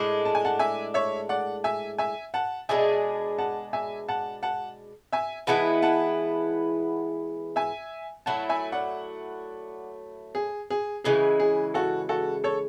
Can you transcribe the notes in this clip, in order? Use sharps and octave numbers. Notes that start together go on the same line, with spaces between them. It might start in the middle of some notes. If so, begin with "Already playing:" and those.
Already playing: A2 G#3 D4
A5
G#5
F#5 A5
E5 G#5
C#5 E5
D5 F#5
E5 G#5
E5 G#5
F#5 A5
B2 G#3 D4 G#4 E5 G#5
F#5 A5
E5 G#5
F#5 A5
F#5 A5
E5 G#5
E3 G#3 B3 E4 F#5 A5
F#5 A5
E5 G#5
F#3 A3 E4 F#5 A5
E5 G#5
D5 F#5
G#4
G#4
C#3 E3 G#3 G#4
G#4
F#4 A4
F#4 A4
A4 C#5